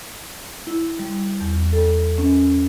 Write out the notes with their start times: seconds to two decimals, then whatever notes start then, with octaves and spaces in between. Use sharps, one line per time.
0.67 E4
0.99 G3
1.40 E2
1.54 E2
1.72 A4
2.18 C#4